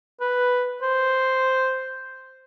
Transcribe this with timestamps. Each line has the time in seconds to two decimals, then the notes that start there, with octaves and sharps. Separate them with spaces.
0.21 B4
0.82 C5